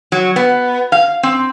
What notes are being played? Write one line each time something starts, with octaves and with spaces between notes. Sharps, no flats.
F#3
B3
F5
C4